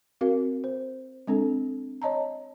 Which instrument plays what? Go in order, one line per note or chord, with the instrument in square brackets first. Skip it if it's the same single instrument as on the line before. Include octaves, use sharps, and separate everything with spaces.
[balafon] C4 F#4 A#4 F5
C5
G#3 C4 D4 A4
C#5 D#5 A5 A#5